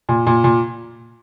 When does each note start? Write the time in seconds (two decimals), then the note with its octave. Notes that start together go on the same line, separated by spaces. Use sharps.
0.09 A#2
0.27 A#2
0.44 A#2